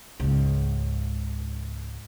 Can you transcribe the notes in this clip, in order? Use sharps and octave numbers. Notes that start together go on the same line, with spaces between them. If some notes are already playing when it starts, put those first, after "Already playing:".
C#2 G#2